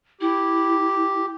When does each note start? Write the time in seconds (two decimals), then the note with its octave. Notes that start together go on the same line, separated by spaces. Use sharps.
0.21 E4 G4